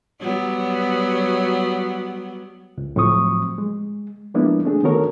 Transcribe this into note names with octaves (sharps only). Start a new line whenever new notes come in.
F#3 G3 B3
C#2
A2 F3 F#3 C4 C#6 D#6
G#3
F3 G#3 A#3 B3 D4 E4
A3 C4 D4 G#4
D#3 B3 F#4 A4 A#4 C#5